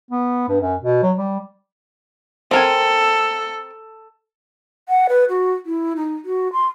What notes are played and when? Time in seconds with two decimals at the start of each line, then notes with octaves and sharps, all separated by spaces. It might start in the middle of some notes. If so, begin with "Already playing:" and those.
0.11 B3
0.48 G2
0.60 F#2
0.82 B2
1.03 F#3
1.16 G3
2.51 C4 A4 A#4 G#5
4.89 F#5
5.09 B4
5.29 F#4
5.66 E4
5.96 D#4
6.25 F#4
6.53 C6